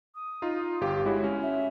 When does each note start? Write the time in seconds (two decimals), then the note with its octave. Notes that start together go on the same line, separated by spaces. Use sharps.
0.15 D#6
0.42 D#4 F4
0.81 G1 G4 F5
1.05 G#3 E4 F#4 C#5
1.24 C#4
1.42 E5